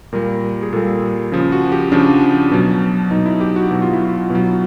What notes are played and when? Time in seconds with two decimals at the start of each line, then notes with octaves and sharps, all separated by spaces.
0.12 A#2 G3 A#4
0.62 G#4
0.73 A#2 G3 A4
1.32 C#3 F3
1.52 F#4
1.72 G4
1.92 C#3 F3 D4
2.51 B2 F#3
3.11 B2 F#3 D#4
3.26 E4
3.40 G4
3.56 F#4
3.70 B2 F#3 F#4
3.82 F4
3.93 E4
4.05 F4
4.30 B2 F#3